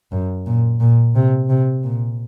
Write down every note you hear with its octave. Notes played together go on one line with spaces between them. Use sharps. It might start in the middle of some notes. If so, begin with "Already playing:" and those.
F#2
A#2
A#2
C3
C3
A#2